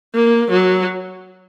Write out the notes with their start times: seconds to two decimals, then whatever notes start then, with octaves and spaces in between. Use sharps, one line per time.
0.15 A#3
0.51 F#3